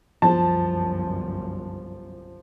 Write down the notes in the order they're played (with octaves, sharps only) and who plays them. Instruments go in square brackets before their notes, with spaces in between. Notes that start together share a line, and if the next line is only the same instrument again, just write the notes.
[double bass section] G1 C2 F#2 [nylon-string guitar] F3 [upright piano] A5